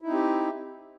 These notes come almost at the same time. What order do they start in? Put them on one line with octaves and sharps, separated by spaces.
E4 D#4 C4 G4